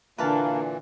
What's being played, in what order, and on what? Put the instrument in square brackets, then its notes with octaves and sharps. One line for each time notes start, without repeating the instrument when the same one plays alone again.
[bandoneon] A#2 E3 [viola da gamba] D3 D4 [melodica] A#3 [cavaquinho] B4 F5 A5